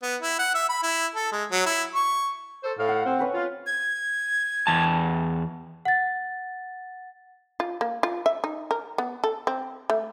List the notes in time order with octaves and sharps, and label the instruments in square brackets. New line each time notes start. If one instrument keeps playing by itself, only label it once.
[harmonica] B3
E4
F#5
E5
B5
E4
A4
G#3
F#3
E4
C#6
[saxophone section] A4 C5
A2 F5
[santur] F#5
[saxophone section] C4
[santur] C#4 B4 F#5
[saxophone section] F4
[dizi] G#6
[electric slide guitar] E2 A5
[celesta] F#5 A6
[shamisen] F4
A#3
F4
E5
D#4
A#4
B3
A4
C4
A3